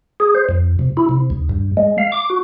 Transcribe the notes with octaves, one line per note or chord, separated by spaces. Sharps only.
G#4
C5
F2
C3
E4
C3
D#2
G2
G#3
F5
D6
F#4